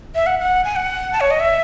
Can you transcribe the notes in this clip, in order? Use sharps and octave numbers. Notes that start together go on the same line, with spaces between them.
E5
F#5
F#5
G#5
F#5
A5
C#5
D#5
E5